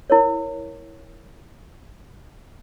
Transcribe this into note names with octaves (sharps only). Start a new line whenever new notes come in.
E4 A#4 C#5